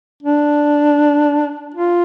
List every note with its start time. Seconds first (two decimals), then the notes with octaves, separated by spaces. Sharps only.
0.23 D4
1.75 F4